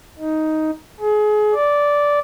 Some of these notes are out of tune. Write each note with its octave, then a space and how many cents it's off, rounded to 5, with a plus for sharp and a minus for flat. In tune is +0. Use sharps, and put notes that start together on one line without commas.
D#4 +10
G#4 +30
D5 -10